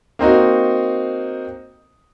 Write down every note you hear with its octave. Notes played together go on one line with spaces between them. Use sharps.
A#3 C4 D#4 F#4